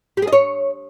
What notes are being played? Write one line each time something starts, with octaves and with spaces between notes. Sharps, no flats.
G4
G#4
D#5
C#5